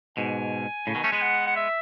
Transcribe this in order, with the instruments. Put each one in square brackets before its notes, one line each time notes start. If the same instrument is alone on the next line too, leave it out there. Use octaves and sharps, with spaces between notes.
[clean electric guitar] G#2 B2 [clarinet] G#5
[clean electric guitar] A2 C#3
B2 D#3
A3 C#4
G#3 B3
[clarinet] F#5
F#5
E5